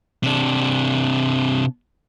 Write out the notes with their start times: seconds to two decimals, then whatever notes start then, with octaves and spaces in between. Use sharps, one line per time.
0.24 C3 D4